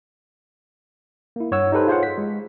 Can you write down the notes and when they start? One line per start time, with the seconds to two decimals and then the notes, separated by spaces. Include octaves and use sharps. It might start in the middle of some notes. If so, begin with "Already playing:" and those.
1.36 A#3 E4
1.51 G2 C#5 F#5 E6
1.72 D#4 G4 A4 B4 C5
1.88 F4 G#4 C5 C#5 F5 F#5
2.03 B6
2.18 G#3